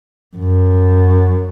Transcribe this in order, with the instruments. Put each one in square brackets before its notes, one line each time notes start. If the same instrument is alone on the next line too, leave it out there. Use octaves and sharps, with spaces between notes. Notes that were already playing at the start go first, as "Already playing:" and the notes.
[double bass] F#2